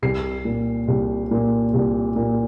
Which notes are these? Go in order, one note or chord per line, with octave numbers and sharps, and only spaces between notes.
C2 C7
A#2
C2
A#2
C2
A#2